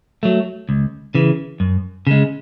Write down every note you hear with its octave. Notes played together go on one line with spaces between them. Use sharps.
F#3 A3
C#2
C#3 E3
F#2
C#3 G#3